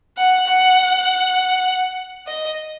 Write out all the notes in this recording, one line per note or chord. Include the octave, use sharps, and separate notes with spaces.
F#5
F#5
D#5